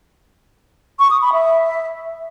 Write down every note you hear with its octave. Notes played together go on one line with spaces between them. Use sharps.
C#6
D#6
B5
E5